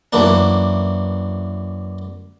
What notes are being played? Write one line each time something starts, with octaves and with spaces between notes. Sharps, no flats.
F#2 E3 A#3 D4